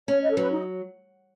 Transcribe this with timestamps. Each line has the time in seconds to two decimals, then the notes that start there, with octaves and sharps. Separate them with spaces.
0.08 C#4 C#5
0.23 D#5
0.31 A4
0.37 F#3 B4
0.52 D#4